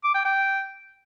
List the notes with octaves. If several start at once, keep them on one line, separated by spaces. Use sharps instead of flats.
D6
G5
G5